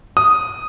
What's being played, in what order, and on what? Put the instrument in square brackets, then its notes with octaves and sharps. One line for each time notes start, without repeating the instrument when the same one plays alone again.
[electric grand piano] D#6